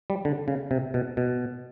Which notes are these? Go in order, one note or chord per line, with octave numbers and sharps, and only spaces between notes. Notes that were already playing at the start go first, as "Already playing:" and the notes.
G3
D3
C#3
C3
B2
B2